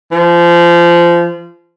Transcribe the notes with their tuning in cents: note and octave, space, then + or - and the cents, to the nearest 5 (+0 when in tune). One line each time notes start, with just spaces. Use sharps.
F3 -25